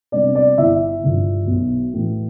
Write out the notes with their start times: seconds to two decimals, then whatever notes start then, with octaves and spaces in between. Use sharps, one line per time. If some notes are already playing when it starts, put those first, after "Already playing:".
0.12 C3 G3 B3 D4 D5
0.35 D5
0.58 G1 E4 E5
1.03 G2 D3 F3
1.47 B1
1.93 A2 E3